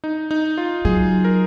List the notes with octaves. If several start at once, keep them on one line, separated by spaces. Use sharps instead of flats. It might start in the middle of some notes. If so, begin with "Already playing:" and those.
D#4
D#4
F4
F#3 G#4
A#4